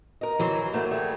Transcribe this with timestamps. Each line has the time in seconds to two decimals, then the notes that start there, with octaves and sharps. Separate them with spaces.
0.21 A#4 D#5
0.40 E3 F#3 C5
0.73 D#3 F#3 A3 A#3
0.91 G3 A3 G#4